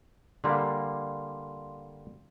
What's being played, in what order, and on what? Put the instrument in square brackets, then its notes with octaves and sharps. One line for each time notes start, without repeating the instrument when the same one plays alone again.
[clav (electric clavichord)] D3 G3 A#3 [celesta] F5 C6